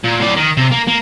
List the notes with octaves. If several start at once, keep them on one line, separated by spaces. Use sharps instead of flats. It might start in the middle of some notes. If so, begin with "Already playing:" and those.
A#2
A2 D5
D#3
C3
A#3
A#3